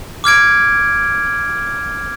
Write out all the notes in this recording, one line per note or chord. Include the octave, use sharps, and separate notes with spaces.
D6 F6 G#6 D7